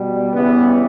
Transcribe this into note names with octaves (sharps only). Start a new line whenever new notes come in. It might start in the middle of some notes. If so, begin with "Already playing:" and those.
Already playing: B2 G3
C#3 E3 G3 B3